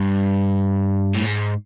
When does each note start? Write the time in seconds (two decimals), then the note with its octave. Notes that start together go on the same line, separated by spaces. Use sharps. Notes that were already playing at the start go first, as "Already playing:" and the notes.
Already playing: G2
1.14 A2
1.25 G#2